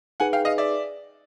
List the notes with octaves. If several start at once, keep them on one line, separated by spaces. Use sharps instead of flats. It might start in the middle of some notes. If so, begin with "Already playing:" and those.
D#4 G#4 B4 F#5 G#5
F5 G5
D#5 F5
D5 E5